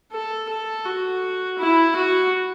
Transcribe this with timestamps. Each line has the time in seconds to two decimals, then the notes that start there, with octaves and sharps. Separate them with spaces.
0.12 A4
0.49 A4
0.85 F#4
1.59 E4
1.96 F#4